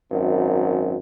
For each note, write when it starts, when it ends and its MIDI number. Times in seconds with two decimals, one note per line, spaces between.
0.11 0.96 32
0.11 0.96 42